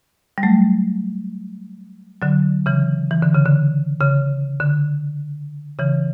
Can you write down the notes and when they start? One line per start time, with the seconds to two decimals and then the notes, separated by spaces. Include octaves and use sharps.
0.38 G3
0.43 F#3 A3
2.22 D3 F#3
2.66 C#3 E3
3.11 E3
3.23 D3
3.35 C#3
3.45 D3
4.01 C#3
4.60 D3
5.79 C#3 E3